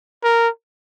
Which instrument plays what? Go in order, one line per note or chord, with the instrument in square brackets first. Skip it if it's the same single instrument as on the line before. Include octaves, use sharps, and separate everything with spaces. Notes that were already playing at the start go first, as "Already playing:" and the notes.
[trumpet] A#4